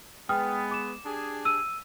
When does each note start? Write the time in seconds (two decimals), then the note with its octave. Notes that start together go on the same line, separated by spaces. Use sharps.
0.29 G#3 B3 G5 D#6 F6
0.71 D6 E7
1.06 D4 G4 G#4
1.45 E6 D#7